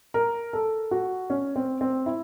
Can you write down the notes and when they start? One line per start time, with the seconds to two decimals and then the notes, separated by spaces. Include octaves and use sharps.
0.14 A#4
0.53 A4
0.91 F#4
1.30 C#4
1.56 C4
1.81 C4
2.06 E4